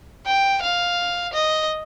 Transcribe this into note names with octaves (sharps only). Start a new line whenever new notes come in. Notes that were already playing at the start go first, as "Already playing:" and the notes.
G5
F5
D#5